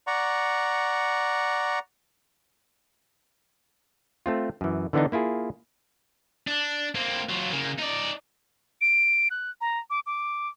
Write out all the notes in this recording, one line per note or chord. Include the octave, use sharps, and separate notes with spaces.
D5 F#5 A#5 C#6
A3 C4 F4
F#2 E3
D3 E3 B3 D4 D#4
A#3 E4 F4 G#4
D4
A#3 C4
F#3 F4
C#3 A#3
D#4 D5
D7
F#6
A#5
D6
D6